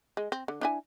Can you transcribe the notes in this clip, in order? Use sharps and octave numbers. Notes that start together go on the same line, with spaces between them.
G#3
C4
D3
D4 E4 G#5